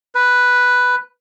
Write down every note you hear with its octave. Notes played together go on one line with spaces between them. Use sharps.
B4